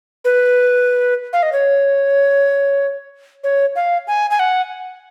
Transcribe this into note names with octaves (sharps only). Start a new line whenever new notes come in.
B4
F5
D#5
C#5
C#5
F5
G#5
G#5
F#5